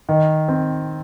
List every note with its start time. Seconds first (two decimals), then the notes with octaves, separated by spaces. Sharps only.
0.09 D#3
0.48 C4